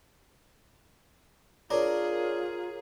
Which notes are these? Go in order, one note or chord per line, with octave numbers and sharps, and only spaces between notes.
D4 F4 G#4 A#4 C#5 A#5